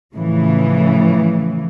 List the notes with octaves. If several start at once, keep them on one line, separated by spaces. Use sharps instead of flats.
A2 C#3 E3 F3